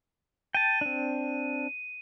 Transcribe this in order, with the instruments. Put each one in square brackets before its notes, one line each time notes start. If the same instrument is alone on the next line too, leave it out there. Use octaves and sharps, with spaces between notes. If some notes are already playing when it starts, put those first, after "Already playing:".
[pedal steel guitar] G5 A5 [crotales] D#7
[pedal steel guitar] C4 D4